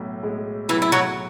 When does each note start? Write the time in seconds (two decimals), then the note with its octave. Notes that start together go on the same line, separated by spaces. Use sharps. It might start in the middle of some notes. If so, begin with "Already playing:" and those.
Already playing: B1 A2
0.23 A2 G#3
0.69 B1 E3 E4
0.82 E4
0.92 F#3 F#4